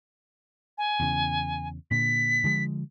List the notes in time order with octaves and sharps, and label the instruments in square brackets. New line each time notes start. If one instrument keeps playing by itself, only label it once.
[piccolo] G#5
[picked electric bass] E2 C#3
[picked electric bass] A#2 D3 [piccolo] B6
[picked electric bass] D3 F3 G#3